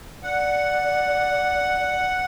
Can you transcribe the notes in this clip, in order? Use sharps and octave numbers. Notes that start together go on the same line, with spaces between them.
D5 F#5